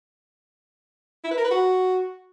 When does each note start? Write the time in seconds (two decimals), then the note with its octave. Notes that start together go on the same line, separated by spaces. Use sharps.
1.24 E4
1.31 B4
1.38 A#4
1.44 B4
1.51 F#4